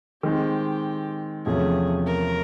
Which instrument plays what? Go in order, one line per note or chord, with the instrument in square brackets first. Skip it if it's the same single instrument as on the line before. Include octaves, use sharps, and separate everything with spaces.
[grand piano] D#3 G#3 C4 [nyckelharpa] G4
[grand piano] E2 C3 F3 A3 C#4 [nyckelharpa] G#4
[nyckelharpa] A#4